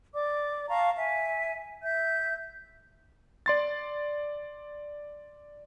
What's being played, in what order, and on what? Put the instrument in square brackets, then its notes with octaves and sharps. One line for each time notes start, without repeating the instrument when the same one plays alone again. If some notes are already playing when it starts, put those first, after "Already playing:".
[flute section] D5 D6
F5 A5 A#5 C#6
E5 G#5
E5 G6
[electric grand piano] D5 C6 A6